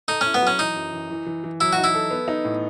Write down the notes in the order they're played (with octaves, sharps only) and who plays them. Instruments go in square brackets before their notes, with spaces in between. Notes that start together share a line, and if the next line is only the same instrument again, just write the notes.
[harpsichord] D#4 [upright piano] A4
[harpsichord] C#4 [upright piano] E4
[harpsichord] B3
[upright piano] F#3
[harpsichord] C#4
[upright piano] E3 [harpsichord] D#4
[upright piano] F#2
E3
E3
E3
E3
[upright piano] F#3 [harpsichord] E4
[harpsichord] F#4
[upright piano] D#4
[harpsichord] E4
[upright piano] A4
B3
D#4
A2